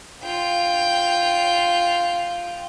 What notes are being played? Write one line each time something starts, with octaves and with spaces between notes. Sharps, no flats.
F4 G5